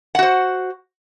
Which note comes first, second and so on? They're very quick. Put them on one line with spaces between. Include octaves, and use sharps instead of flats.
F#5 F#4 C5